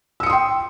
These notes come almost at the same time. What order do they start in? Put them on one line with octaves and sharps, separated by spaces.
E6 C#7 D#6 C6 G5